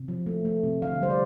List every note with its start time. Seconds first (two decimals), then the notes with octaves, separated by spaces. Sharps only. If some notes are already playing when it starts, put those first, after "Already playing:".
Already playing: C3
0.08 F3
0.26 A3
0.45 A3
0.63 C3
0.82 D3 F5
1.01 G3 C5
1.10 D5